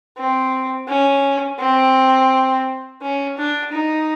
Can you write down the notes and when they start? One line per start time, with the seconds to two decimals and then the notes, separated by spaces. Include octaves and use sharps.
0.18 C4
0.88 C#4
1.59 C4
3.02 C#4
3.38 D4
3.73 D#4